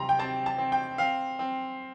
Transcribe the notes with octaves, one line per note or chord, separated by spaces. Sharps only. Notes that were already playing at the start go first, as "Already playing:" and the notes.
Already playing: C3 G3 A#5 C6
G5
C4 A5
A5
C4
G5
C4 F5
C4